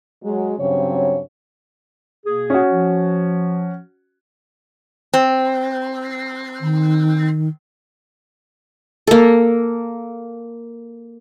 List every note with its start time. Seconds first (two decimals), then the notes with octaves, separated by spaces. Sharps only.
0.23 F#3 G#3
0.58 G2 C#3 F#3 C4 C#5
2.25 B2 A#3 G#4
2.50 C#4 F#4
2.70 F3
5.14 C4
6.61 D#3
9.07 A#3 A4